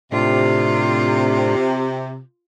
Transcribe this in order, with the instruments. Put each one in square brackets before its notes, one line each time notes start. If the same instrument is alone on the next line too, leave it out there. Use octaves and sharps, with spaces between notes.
[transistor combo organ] A2 D4 [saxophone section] C3 [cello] F4